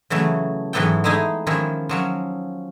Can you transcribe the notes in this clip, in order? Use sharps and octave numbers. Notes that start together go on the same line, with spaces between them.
C#3 E3 F#3 A3
G#2 E3 F#3 B3 A4 G5
G#3 A3 D#4 E4 G#4
D#3 F3 G#3 C#4 E4 C#5
F3 F#3 C#4